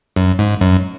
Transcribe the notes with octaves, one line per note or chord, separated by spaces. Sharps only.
F#2
G#2
F#2